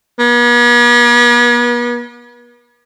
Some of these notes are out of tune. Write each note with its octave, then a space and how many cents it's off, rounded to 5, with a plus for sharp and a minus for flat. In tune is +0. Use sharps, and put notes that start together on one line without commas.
B3 -45